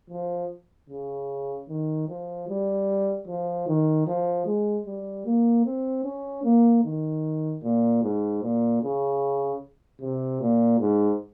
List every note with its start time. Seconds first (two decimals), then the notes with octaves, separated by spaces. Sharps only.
0.10 F3
0.90 C#3
1.69 D#3
2.09 F3
2.48 G3
3.28 F3
3.68 D#3
4.07 F3
4.46 G#3
4.86 G3
5.26 A#3
5.65 C4
6.05 C#4
6.44 A#3
6.84 D#3
7.63 A#2
8.03 G#2
8.43 A#2
8.83 C#3
10.01 C3
10.41 A#2
10.80 G#2